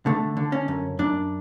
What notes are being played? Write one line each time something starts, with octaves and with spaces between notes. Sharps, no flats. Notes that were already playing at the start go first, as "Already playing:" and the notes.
D3 A3
D3
C#4
F#2
F#2 D4